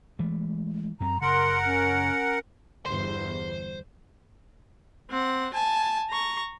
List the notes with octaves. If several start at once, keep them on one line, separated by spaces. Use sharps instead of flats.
E3 G#3 A3
F#2 C4 A#5
F#1 C#3 A#4 F#5 C6
C#4
G1 E2 C5 C6
C4 F#5
G#5 A5
A#5 C#6